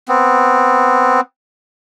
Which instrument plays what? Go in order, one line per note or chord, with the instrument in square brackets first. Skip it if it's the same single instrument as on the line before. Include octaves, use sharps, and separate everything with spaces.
[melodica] B3 C4